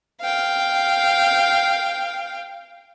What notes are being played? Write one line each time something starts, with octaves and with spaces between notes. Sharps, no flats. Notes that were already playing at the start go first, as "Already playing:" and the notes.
F5 G5